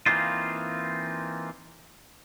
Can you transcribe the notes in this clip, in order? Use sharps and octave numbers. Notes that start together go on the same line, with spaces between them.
E3 A#3 C4 D#4 F4